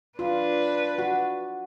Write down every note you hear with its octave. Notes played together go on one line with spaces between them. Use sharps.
D4 F4 B4
F#4